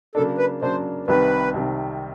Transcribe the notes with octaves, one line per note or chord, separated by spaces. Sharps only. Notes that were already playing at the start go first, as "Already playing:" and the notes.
C#3 F#3 A#3 D4 A4
B4
C#3 F#3 A#3 D4 C5
C2 C3 D#3 B4
C2 C3 D#3